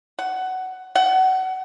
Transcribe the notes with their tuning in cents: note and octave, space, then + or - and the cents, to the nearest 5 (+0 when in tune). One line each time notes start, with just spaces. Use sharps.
F#5 +15
F#5 +25